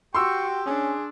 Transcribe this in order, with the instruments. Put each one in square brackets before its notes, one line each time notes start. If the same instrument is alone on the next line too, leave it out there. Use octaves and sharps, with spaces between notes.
[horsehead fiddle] F#4 [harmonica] G4 G5 [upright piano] C6 E6 [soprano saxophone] C#6
[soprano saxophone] C#4 [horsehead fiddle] D4 [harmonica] G#4